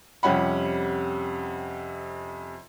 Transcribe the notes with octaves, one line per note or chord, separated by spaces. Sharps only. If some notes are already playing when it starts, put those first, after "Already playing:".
F2 C3 G3 C#4 F#5 B5